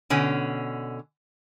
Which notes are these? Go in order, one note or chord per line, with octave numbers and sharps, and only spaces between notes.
B2 D3 C#4